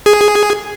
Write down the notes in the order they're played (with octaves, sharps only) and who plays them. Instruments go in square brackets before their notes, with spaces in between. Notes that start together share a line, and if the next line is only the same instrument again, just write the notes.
[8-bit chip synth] G#4